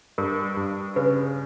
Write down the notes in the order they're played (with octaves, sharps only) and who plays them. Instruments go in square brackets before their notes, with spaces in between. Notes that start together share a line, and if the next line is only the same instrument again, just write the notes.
[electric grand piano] G2 [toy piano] A#4
[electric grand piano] G2
[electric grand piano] C#3 [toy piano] B4